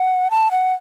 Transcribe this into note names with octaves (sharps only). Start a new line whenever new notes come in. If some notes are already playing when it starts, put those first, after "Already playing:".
Already playing: F#5
A5
F#5